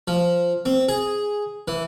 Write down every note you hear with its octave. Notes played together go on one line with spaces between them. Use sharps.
F3
C4
G#4
E3